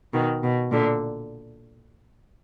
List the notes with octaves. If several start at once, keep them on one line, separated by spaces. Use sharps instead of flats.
B2 D#3
B2
A#2 D3